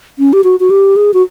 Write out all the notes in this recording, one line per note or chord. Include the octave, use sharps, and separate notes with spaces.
C#4
G4
F#4
F#4
G4
G#4
F#4